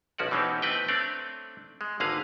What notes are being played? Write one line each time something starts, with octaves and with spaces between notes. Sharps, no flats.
B1 F3 C#4 F#4 A4 D5
B2 E3 C4 C#4 D#4 G4
A3 B3 C4 B4 D#5 G5
A3 C4 D4 C#5 D5
G#3
G#1 D3 A#3 G#4 B4 F5